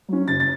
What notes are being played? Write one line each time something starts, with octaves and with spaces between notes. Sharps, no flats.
F#3 C#4
F#1 A6
A6